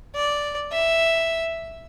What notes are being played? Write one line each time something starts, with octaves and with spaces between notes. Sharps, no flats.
D5
E5